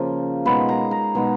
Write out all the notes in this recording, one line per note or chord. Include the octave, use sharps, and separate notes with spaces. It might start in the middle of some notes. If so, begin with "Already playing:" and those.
Already playing: C#3 F3 A#3
B2 G#3 B3 D#4 B5
A#5
A#5
B2 G#3 B3 D#4